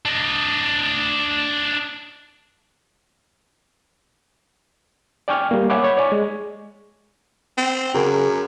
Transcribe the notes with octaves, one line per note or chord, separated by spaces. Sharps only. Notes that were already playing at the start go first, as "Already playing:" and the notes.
D4 D#5
D5 G5 G#5 C#6 F6
G3 A#3
C#5 E5 F#5 G#5 B5 D6
C#5 B5
C#5 D5 G#5 C#6
G#3
C4
F#2 C#3 G#4 A#4